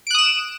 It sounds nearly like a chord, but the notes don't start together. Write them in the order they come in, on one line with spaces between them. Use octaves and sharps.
D7 F#6 D#6 E7